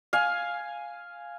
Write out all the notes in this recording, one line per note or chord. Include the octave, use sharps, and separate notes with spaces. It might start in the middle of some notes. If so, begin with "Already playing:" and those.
F5 G#5